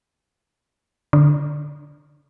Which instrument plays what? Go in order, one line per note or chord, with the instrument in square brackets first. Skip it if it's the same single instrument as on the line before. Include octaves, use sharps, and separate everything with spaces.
[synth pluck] D3